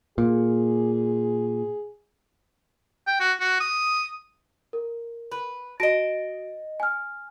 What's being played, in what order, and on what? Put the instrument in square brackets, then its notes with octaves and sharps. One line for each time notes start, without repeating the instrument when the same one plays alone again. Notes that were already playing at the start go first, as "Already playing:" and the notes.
[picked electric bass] A#2 [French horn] G#4
[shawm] G5
F#4
F#4
D#6
[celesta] A#4
[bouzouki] B4
[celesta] F#4 A#6 D7 [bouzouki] D#5 A5
[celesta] G#5 F6